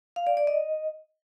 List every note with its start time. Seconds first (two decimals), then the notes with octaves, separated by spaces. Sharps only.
0.16 F5
0.27 D5
0.37 D5
0.47 D#5